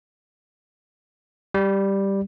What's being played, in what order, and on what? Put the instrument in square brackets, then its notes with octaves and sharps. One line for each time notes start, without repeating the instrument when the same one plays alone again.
[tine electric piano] G3